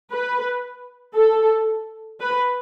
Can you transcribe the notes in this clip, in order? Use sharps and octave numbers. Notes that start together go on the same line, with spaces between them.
B4
A4
B4